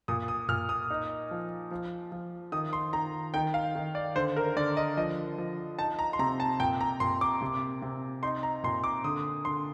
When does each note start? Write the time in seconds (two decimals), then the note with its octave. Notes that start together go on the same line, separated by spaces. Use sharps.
0.08 A#2 D#6
0.28 D#6
0.49 A#2 F6
0.69 D#6
0.90 D#4
1.31 F3
1.71 F3
2.12 F3
2.52 D#3 D#6
2.73 C6
2.93 D#3 A#5
3.34 D#3 G5
3.54 F5
3.76 D#3
3.95 D5
4.16 D3 C5
4.36 A#4
4.56 D3 D5
4.77 D#5
4.97 F3 D#5
5.38 F3
5.79 D#4 A5
5.99 A#5
6.13 C6
6.19 C3 A#5
6.40 A5
6.60 A#2 G5
6.81 A#5
7.00 A#2 C6
7.21 D6
7.42 C3
7.82 C3
8.23 D#4 C6
8.43 A#5
8.64 A#2 C6
8.84 D6
9.04 D3 D#6
9.45 D3 C6